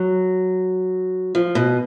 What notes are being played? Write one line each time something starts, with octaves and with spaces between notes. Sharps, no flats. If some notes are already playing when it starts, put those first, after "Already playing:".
Already playing: F#3
F3
B2